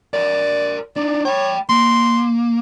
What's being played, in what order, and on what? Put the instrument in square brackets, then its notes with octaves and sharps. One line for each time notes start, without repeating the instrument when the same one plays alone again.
[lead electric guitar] A#4 C#5 [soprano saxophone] D5
[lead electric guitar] D4 D#4 [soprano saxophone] D5
[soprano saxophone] C#5 [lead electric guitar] G5 B5
[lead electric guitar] A#3 [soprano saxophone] C6